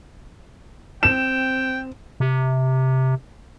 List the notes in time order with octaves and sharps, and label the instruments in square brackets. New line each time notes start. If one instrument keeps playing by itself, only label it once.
[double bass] C4 [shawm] G5 [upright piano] E7
[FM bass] C3